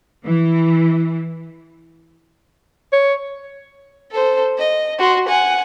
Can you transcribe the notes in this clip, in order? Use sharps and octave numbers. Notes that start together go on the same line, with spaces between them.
E3
C#5
A4 C5
D#5
F#4 C6
F#5 G#5